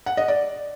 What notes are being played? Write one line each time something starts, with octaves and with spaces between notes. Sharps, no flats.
F#5
D#5
D5